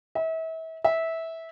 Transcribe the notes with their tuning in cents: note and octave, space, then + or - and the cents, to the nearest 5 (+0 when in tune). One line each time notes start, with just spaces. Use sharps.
E5 -35
E5 -15